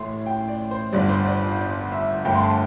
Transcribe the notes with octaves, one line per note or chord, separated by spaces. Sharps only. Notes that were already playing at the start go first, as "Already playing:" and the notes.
Already playing: A1 A2 A3 C6
G5
D5
C5
G1 G2 G3 D5
C5
D5
D5
D5
E5
G1 G2 D3 A3 G5
C6
A5